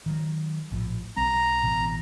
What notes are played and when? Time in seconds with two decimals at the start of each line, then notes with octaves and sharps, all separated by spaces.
0.06 D#3 F3 F#3
0.72 A#1 A2 F3
1.17 B1 G3 C4 A#5
1.62 A1 B2 E3